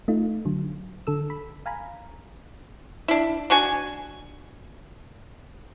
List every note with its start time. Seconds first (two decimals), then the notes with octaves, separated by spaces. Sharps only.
0.08 A3 D#4 F4
0.45 D3 F#3
1.07 D3 A4 E6
1.30 B5
1.66 F5 G#5 A#5 B5
3.08 D4 E4
3.50 D4 F#4 G#5